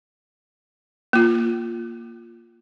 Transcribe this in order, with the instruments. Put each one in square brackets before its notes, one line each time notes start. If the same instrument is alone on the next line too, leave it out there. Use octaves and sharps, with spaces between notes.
[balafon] A#3 F4